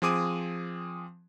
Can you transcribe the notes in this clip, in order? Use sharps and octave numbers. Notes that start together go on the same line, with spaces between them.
F3 C4 G#4 D6 D#6 D#7